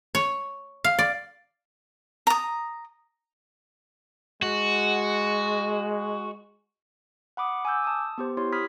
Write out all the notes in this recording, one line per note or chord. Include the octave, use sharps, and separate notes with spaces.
C#5
F5
D5
A#5 D#6
G#3 F#4
F#5 B5 D6 D#6
G#5 D6 E6 G6
A5 D#6
B3 G4 C5
E4 G4 C#5 C6
B5 D#6 F6 G#6 B6